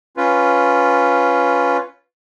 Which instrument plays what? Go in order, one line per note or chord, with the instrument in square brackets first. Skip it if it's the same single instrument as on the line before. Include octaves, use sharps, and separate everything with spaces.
[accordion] C#4 F4 B4